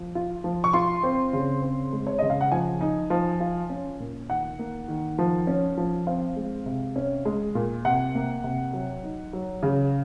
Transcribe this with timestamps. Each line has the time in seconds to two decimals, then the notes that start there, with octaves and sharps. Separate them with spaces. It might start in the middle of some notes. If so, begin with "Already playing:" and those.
Already playing: F3
0.15 F4
0.44 F3
0.64 C#6
0.73 F4 C6
1.03 C4
1.33 C#3
1.62 C4
1.93 G#3
2.07 C#5
2.19 C#3 D#5
2.30 F5
2.41 F#5
2.52 F3 G#5
2.81 D#4
3.10 F3
3.40 F4
3.70 C#4
4.00 A#2
4.29 D#3 F#5
4.59 A#3
4.88 D#3
5.18 F3
5.47 C#4
5.77 F3
6.07 C4 F5
6.36 G#3
6.66 C3
6.96 C#4
7.25 G#3
7.55 A#2
7.85 C3 F#5
8.15 A#3
8.44 C3
8.73 F#3
9.03 D#4
9.33 F#3
9.63 C#3